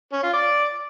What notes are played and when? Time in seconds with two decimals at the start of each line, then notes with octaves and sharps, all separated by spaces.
0.13 C#4
0.23 F4
0.33 D5